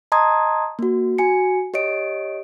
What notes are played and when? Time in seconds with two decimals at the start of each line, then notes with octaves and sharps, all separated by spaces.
0.12 D#5 A5 A#5 C6 D#6 G#6
0.79 A#3 F#4
1.18 F#4 G#5 C#7
1.74 G4 C#5 D#5 D7